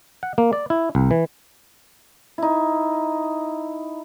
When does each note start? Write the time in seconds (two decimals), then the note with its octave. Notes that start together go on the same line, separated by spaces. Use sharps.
0.23 F#5
0.38 A#3
0.53 D5
0.70 E4
0.95 C2
1.11 E3
2.38 D#4 E4